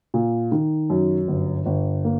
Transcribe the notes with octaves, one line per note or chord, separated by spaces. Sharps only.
A#2
D#3
F#2
G1
G1
A#3